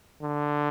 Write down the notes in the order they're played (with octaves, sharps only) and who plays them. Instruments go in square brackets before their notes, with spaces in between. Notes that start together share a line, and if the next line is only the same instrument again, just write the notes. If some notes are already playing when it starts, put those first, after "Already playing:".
[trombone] D3